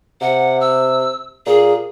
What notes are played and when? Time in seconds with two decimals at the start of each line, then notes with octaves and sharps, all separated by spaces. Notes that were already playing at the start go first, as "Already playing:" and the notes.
0.21 C3 F#5
0.60 E6
1.46 A#2 G#4